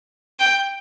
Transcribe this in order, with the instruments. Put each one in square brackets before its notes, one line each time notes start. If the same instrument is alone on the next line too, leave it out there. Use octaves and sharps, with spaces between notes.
[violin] G5